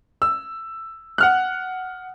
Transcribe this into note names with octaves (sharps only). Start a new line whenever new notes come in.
E6
F#5 F6 F#6